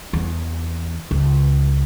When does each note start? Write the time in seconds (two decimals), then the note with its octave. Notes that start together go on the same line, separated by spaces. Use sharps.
0.13 E2
1.11 C#2